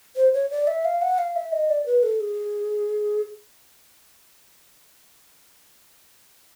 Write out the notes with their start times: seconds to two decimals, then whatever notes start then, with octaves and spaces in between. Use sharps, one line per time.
0.16 C5
0.33 C#5
0.51 D5
0.67 E5
0.85 F5
1.02 F#5
1.18 F5
1.36 E5
1.52 D#5
1.69 D5
1.86 B4
2.03 A4
2.20 G#4